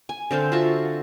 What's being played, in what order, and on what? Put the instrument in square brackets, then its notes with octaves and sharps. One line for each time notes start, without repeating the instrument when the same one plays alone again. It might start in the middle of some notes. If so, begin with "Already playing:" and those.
[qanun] G#5
D3 C4 C5 F5
F4 F#4 E5 A5